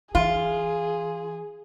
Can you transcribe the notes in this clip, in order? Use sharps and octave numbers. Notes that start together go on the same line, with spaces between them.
E3 F4 G#4